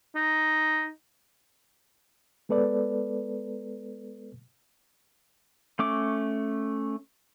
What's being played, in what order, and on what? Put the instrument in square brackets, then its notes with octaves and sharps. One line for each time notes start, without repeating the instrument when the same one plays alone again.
[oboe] D#4
[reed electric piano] G#3 B3 A4 B4 D5
[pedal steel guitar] A3 C#4 D6